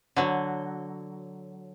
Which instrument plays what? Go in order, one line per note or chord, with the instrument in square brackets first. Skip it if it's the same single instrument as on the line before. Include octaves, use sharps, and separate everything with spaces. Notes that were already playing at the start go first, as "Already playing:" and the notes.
[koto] D3 F#3